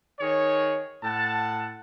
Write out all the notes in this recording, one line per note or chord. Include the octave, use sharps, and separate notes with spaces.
D#3 G#4 C#5
A2 F#5 A5